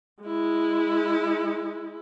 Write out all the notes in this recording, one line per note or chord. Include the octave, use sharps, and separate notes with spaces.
G#3 E4